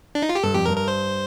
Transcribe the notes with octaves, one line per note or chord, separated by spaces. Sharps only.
D4
D#4
F4
G4
G2 A4
F2 G4
G2 A#4
A#4
C5